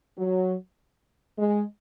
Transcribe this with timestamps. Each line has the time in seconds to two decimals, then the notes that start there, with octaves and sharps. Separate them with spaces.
0.18 F#3
1.38 G#3